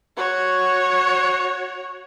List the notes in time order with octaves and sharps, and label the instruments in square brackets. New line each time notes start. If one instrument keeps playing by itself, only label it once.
[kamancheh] F#4 C#5